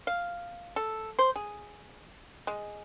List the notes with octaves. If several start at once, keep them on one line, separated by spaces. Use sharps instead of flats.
F5
A4
C5
G#4
G#3